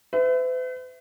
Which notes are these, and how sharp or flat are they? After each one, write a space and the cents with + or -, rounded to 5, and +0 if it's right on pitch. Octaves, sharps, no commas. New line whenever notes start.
B4 +45 E5 +0